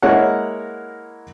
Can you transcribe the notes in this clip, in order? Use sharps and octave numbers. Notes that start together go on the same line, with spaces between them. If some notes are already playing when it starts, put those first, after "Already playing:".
G#3 A#3 E4 A#4 C#5 F#5